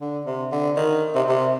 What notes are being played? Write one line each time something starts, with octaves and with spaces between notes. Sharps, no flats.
D3
C3
D3
D#3
C3
C3